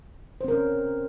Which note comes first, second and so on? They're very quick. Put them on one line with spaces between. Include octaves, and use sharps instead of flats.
C5 C4 A#4 C#4